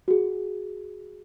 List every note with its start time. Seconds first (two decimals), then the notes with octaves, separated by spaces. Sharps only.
0.08 F#4 G#4